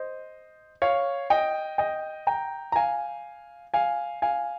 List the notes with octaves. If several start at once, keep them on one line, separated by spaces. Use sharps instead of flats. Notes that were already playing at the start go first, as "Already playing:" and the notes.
Already playing: C5 D#5
C#5 F5
D#5 G5
D#5 G5
G5 A#5
A#5
F5 G#5
F5 G#5
F5 G#5